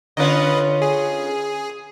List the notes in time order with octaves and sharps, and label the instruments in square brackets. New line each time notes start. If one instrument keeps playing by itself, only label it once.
[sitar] D3 C#4 F4 [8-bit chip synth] B4 D#5
[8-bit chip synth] G#4